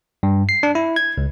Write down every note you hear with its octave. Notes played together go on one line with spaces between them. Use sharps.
G2
C7
D4
E4
G#6
C#2